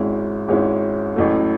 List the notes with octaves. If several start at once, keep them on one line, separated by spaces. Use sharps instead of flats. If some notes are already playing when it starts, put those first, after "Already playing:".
Already playing: G#1 G#2 G#3 C#4 E4
G#1 G#2 G#3 C#4 E4
A1 A2 F#3 A3